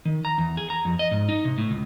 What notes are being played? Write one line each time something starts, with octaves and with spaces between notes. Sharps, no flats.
D#3
A#5
E2
G#4
A#5
F2
D#5
G#2
D#4
C3
A2
C#2